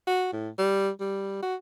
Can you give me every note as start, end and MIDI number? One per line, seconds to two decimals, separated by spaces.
0.07 0.29 66
0.33 0.49 45
0.58 0.89 55
1.00 1.37 55
1.42 1.55 66